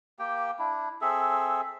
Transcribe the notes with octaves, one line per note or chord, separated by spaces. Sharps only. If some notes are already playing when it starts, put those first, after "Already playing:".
A#3 G4 G5
D4 E4
C4 G#4 A4 E5